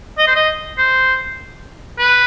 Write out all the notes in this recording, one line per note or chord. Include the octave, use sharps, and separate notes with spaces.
D#5
C5
D#5
C5
B4